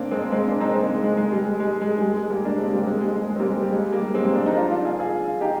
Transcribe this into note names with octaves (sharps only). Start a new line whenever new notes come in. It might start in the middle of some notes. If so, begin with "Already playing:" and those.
Already playing: A#3 C4 D4
G#3 C4
G#3 C4
A#3 D4
C4 D#4
G#3 C4
G#3
G#3
G#3
G3
G#3
G#3
G#3
G3
G#3
G#3
G3 A#3
A#3 D4
G#3 C4
G3 A#3
G#3 C4
G#3
G#3
G#3
C4
G3 A#3
G#3
G3
G#3
G3 A#3
G#3 C4
G#3 C4
A#3 D4
C4 D#4
D4 F4
D4 F4
F4 G#4
F4 G#4
D#4 G4